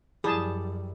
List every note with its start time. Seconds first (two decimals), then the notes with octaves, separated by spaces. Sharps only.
0.24 F#2 F3 G3 E4 G#4 A5